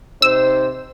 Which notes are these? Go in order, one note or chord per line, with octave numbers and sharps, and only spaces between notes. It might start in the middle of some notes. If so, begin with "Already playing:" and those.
C3 D#4 C5 E6